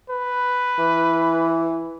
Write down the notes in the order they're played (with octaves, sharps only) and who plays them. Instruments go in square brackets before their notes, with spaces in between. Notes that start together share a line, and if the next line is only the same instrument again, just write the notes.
[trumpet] B4
[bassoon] E3